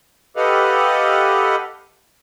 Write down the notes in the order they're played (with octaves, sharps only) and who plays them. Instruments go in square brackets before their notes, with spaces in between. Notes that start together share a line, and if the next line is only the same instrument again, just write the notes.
[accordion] G4 A4 B4 D#5 F5 F#5